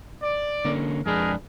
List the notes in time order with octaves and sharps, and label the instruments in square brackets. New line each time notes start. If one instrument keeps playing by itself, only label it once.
[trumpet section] D5
[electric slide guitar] D3 A#3 C#4
[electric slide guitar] F2 G#3 D4 [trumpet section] G#4 A#4 B4